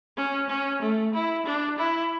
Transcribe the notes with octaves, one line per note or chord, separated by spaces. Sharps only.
C#4
C#4
A3
E4
D4
E4